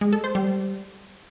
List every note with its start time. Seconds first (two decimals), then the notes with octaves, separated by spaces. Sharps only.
0.01 G#3
0.13 A4
0.24 C5
0.35 G3